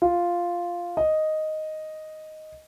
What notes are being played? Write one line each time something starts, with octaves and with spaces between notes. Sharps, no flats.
F4
D#5